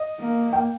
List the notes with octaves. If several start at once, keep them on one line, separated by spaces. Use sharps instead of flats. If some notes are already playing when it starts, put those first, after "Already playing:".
Already playing: D#5
A#3
G5